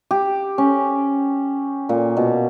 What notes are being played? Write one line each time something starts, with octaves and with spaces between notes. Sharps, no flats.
G4
C#4
A#2
B2